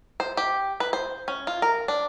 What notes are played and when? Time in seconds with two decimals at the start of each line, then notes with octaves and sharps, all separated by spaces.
0.20 C5
0.37 G4
0.80 B4
0.93 C5
1.28 C#4
1.47 F4
1.62 A#4
1.88 D4